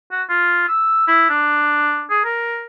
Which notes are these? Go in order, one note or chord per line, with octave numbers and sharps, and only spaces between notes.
F#4
F4
E6
E4
D4
G#4
A#4